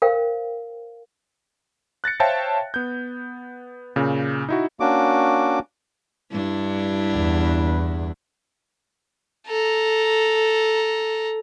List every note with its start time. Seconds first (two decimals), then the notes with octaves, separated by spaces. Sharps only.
0.02 A#4 C5 F5 G5
2.04 F#6 A6 A#6 C#7
2.20 C5 C#5 E5 F5 G5 A5
2.74 B3 G6
3.96 A#2 C#3
4.49 D#4 E4 F#4
4.80 A#3 C#4 D4 F#4 D6
6.32 G2 D4 E4
7.16 E2
9.47 A4 A#5